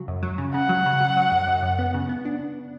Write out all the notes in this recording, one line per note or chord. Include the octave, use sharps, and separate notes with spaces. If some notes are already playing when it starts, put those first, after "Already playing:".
Already playing: C#3 F#3
F#2
F#3
C#3
C#3 F#5
F#3
C#3
F#3
F#3
F#2
F#2
F#2
B3
C#3
B3
D4